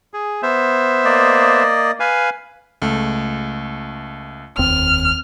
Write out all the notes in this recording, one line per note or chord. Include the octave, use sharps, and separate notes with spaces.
G#4
B3 C5 E5
A#3 D5 D#5
B4 F5 G#5
C#2 A3
F1 D#2 C4 F6